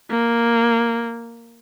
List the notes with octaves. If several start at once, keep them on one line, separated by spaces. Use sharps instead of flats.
A#3